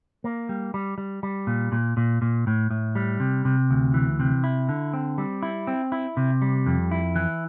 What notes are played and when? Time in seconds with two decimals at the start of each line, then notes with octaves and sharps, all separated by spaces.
0.24 A#3
0.49 G3
0.74 G3
0.98 G3
1.23 G3
1.47 A#2
1.72 A#2
1.97 A#2
2.22 A#2
2.47 A2
2.71 A2
2.95 G3
3.20 C3
3.45 C3
3.70 D2
3.94 E3
4.20 C3
4.44 E4
4.69 D3
4.94 C4
5.18 G3
5.43 E4
5.67 C4
5.92 E4
6.17 C3
6.42 G3
6.66 F2
6.91 E4
7.16 E3